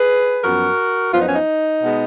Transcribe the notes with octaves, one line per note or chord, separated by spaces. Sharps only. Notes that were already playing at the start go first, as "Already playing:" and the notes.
Already playing: G#4 B4
F#2 F3 B3 F#4 A#4
F#2 F3 B3 F4
D#4
C#4
D#4
B2 G#3 B3